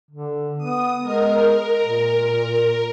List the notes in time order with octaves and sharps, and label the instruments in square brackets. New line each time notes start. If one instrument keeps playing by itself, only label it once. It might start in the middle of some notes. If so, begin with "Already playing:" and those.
[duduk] D3
[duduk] B3 [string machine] D#6
[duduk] G#3 [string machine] A#4
[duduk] A#2